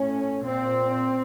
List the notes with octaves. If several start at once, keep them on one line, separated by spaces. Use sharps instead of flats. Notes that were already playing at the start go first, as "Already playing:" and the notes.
Already playing: A2 C#4
A#2 C4